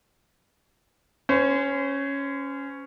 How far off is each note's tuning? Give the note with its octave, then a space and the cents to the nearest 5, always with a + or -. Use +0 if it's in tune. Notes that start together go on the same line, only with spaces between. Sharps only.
C#4 +0 C5 -35